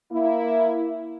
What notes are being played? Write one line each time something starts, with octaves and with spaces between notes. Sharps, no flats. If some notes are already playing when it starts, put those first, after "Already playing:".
A#3 E4